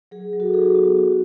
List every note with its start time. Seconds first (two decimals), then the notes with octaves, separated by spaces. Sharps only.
0.11 F#3 G#4
0.33 F#3
0.40 F#4 A4
0.54 D#4 G#4
0.75 B3 F#4
0.97 F#4